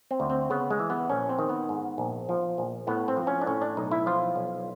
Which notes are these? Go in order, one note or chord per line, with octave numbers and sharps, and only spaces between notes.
C4
D2
C4
C#3 B3
G#3
E3
B3
A#1 C#4
C4
D#3
B3
G#2
A#1
F3
A#1
A2 B3
C4
F3
C#4
D4
A2 C#4
D4
B1 D#4
E4
F3 F4
B1